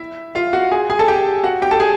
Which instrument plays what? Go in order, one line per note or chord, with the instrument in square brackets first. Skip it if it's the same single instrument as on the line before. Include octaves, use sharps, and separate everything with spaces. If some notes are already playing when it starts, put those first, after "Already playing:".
Already playing: [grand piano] E4 E5
F4 F5
F#4 F#5
G#4 G#5
G#4 G#5
A4 A5
G4 G5
F#4 F#5
G4 G5
A4 A5
G#4 G#5